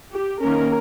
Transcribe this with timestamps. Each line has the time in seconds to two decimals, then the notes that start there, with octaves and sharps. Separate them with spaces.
0.11 G4
0.41 D#3 A#3 C#4 A#4